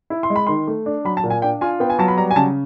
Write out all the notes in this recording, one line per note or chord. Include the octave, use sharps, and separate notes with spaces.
E4
C6
G#3
B5
D#3 C6
A3
D4
F#3 B5
A5
A#2
G#5
D4 G5
F4 G#5
B3 G5
G#5
F#3 A5
B5
G3 A#5
G#5
C#3 A5